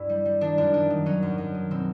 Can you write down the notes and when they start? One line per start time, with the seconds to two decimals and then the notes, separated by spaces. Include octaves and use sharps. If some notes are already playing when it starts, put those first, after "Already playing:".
Already playing: G2 E4
0.09 G3
0.25 G3
0.41 D#3 D4
0.58 F#2 D4
0.74 D#3 D4
0.90 D#3
1.06 F#3 C#4
1.22 F#2
1.38 F#2
1.54 D#3
1.71 B2 C4